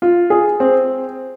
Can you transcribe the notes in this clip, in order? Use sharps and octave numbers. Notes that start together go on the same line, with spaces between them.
F4
G#4
C4